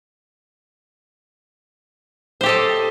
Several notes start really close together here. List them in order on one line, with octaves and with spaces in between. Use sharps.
C5 G4 A4 D#5